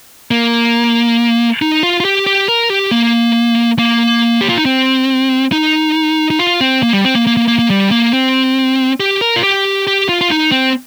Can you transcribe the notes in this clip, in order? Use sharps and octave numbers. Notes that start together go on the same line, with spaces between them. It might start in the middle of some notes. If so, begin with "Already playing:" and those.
A#3
D#4
F4
F4
G4
G4
A#4
G4
A#3
A#3
G4
F4
D#4
C4
D#4
D#4
F4
C4
A#3
G3
C4
A#3
A#3
A#3
A#3
A#3
G3
A#3
C4
G4
A#4
F4
G4
G4
F4
F4
D#4
C4